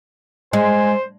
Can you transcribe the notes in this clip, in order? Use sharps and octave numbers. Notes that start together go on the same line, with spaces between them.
G#3 C5 G#5